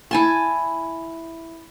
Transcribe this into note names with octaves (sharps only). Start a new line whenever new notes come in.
E4 G#5 A5